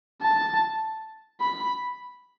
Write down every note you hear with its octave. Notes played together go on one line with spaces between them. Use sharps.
A5
B5